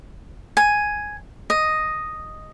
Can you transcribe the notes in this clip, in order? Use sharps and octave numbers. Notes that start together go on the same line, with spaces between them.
G#5
D#5